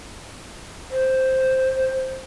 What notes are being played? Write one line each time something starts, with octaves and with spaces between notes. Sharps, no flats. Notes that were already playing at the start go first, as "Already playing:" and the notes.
C5